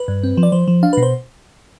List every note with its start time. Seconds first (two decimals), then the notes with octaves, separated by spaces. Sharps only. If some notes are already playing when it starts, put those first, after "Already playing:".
Already playing: B4
0.08 G2
0.23 C4
0.37 F3
0.43 D5
0.52 F3 C5
0.68 F3
0.83 D4 F5
0.93 B2 B4
1.03 C5